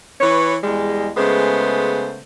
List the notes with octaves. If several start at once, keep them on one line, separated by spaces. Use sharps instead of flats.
E3 B4 C#5
E2 G3 G#3
C#3 G#3 A3 B3 C5